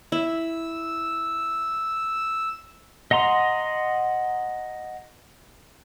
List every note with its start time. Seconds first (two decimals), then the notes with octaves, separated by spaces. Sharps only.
0.12 E4 E6
3.11 D#5 F#5 A#5 C6